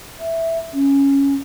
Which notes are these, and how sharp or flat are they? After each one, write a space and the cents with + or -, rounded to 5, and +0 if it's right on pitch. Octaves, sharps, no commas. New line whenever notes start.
E5 +0
C#4 +0